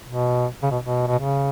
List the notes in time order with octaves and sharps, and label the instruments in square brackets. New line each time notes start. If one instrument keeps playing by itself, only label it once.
[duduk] B2
C#3
B2
B2
B2
C#3